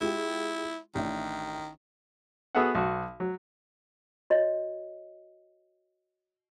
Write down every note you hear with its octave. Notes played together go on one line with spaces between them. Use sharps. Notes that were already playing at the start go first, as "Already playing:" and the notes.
G#3 E4 F4 G4
A1 D#3 D4 E5
B3 F#4 G#4 A4 E5 F#5
B1 F#4
F#3
F#4 C#5 D#5